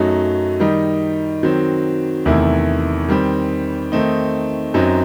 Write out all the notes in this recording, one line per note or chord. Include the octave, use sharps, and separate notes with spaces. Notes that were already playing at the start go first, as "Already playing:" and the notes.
Already playing: F#2 F#3 A3 D#4
D#3 G3 D#4
D#3 F#3 C4
E2 C3 D#3 A3 E4
D#3 G3 C4
D#3 A3 C4 D#4
F#2 F#3 C4 D#4